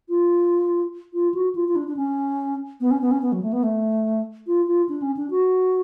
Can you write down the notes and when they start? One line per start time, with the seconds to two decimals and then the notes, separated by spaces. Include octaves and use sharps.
0.09 F4
1.14 F4
1.34 F#4
1.55 F4
1.68 F4
1.76 D4
1.87 D4
1.97 C#4
2.81 B3
2.91 C#4
3.02 B3
3.11 C#4
3.22 B3
3.32 F#3
3.43 A3
3.53 B3
3.63 A3
4.47 F4
4.67 F4
4.89 D4
5.02 C#4
5.17 D4
5.30 F#4